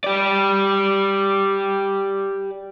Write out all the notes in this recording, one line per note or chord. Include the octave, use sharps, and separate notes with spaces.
G4 D5